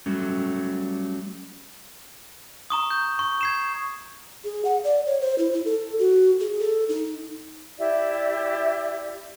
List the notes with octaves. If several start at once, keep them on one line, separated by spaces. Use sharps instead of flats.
F#3 G3 A3 C#4
A#5 C#6 D#6
G6
C#6
G#6 C7 E7
G#4
F#5
D5
C#5
C5
E4
E4
A4
F#4
G#4
A4
D#4
E4 G4 D5 E5